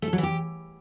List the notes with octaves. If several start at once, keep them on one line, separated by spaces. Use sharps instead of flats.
A3
A4
F#3
E3
G4